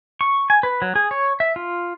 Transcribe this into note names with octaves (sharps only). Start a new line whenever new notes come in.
C#6
G#5
B4
F#3
G#4
C#5
E5
F4